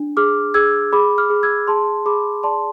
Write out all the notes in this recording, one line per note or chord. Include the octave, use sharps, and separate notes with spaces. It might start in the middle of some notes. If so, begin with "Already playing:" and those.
Already playing: D4
G#4 D6 F6
G#4 E6 G#6
G#4 B5 D6
D6 F6
G#4
E6 G#6
G#4 A5 C6
G#4 B5 D6
D5 A5 C6